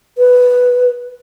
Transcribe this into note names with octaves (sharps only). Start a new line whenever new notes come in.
B4